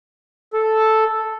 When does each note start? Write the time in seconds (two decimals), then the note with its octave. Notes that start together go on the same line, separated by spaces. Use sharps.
0.54 A4